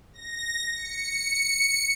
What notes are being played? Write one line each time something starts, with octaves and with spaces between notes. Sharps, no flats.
A#6
C#7